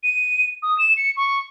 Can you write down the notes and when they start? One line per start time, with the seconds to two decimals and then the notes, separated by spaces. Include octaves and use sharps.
0.03 D#7
0.63 D#6
0.78 E7
0.97 C#7
1.17 C#6